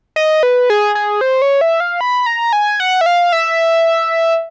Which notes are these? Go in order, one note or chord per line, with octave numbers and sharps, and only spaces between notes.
D#5
B4
G#4
G#4
C5
C#5
E5
F5
B5
A#5
G#5
F#5
E5
F5
E5